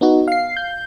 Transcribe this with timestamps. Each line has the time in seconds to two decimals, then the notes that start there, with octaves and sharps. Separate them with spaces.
0.01 B3 D#4 F#4
0.28 F5 C7
0.57 G6